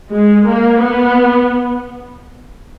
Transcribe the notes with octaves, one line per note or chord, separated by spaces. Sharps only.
G#3
A#3
B3